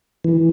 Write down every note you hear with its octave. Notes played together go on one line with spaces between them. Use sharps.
E3